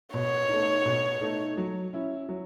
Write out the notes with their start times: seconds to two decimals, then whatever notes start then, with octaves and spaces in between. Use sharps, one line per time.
0.14 B2 C#5
0.49 A3 D#4
0.86 B2
1.21 A3 D#4
1.57 F#3
1.93 C#4 E4
2.29 F#3